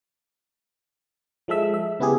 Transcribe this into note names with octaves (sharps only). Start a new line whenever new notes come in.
F3 G#3 A4 E5 E6
E5
C#3 B3 E4 G4 G#4